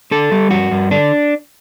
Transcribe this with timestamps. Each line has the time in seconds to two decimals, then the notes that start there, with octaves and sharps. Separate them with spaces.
0.11 D3 A4
0.32 G3
0.51 G2 F#4
0.71 G2
0.91 D3 D4